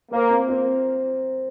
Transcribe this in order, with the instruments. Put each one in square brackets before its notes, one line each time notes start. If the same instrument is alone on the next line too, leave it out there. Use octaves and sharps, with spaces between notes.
[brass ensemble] A#3 [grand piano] C5
[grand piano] C4
C4